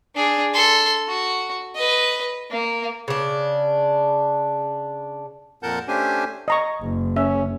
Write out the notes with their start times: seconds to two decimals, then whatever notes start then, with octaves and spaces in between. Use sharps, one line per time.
0.15 D4 G#4
0.54 A4 C6
1.08 F#4
1.75 B4 D#5
2.51 A#3
3.08 C#3 D4
5.63 F2 A#2 A#4 F#5 A5 G6
5.88 A3 C#4 D4 G4 C5 G#5
6.48 D#5 A#5 C#6
6.81 F#1
7.16 C#4 E5